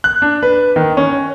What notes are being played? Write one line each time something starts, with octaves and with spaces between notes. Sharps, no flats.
F#6
D4
B4
D#3
C#4